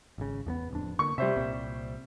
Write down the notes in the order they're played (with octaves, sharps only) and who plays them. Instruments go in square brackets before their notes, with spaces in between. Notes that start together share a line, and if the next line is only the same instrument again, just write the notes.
[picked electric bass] G#1 C#3
E2 A3 B3
D1 F2 D4
[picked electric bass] D3 A#3 [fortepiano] C#6
[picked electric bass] C3 [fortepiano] G3 C5 E5
[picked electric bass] C2 A#2 C4